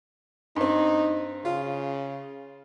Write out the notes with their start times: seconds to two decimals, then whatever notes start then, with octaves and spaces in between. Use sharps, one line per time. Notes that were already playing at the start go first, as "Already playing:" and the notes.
0.56 G2 C4 D#4
1.45 C#3 F4